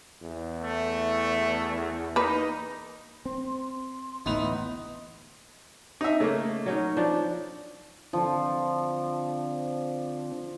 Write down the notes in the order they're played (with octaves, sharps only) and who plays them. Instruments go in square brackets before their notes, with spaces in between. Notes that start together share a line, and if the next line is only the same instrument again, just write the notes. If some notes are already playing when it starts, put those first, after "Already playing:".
[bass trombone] E2
[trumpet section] A3
[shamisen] A#3 B4 [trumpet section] D#4
[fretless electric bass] C4 [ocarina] C6
[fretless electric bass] A1 D2 E3 [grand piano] A2 B3 F7 [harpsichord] D#4
[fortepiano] D#4 E5
[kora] C#3 [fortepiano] A3 A#3
[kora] F#3 C#4 D#4
[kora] F3 [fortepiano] D4
[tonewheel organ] D3 C4 D4 [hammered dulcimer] F3